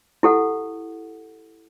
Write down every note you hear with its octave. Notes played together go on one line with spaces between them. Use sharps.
E4 G4 A4 F#5